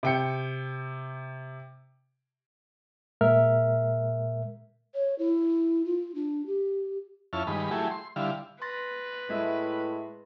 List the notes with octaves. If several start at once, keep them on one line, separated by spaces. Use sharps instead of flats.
C3 G5 C#7
A#2 G#3 A#4 E5 F6
C#5
E4
F4
D4
G4
F2 C#4 E4 A5 F6
G2 D#3 G#3 B5
F#3 A3 E4 G4 G#4
C6
D3 G3 E4 F5
B4 C6 A6 A#6
A2 G#3 E5